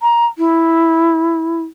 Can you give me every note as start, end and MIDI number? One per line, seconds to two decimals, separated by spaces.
0.02 0.26 82
0.38 1.62 64